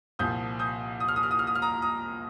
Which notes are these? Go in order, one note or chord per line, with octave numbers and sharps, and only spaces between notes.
C2 A#2 F3 D#6 G6
D#6 G6
D#6
F6
D#6
F6
D#6
F6
D#6
F6
A#5 D#6
A#5 D#6